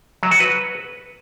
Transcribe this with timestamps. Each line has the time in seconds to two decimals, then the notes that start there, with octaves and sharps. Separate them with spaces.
0.23 F#3
0.31 F#4
0.40 B4